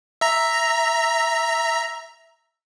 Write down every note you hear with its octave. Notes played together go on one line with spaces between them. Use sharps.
E5 A#5